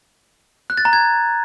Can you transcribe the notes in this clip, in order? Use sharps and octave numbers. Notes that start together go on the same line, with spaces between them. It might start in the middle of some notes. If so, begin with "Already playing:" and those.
F#6
A6
A#5
G#6